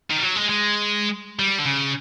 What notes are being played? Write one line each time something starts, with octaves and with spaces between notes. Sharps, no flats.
D#3
G3
F#3
G#3
G#3
G3
D3
C#3